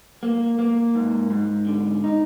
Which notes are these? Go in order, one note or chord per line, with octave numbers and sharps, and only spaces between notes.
A#3
A#3
G#2
G#2
D3
D#4